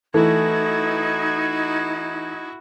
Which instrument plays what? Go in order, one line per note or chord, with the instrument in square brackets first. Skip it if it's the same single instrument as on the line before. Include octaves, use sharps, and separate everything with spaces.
[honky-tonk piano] E3 [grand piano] A3 [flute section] D#4 G#6 [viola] E4 F#4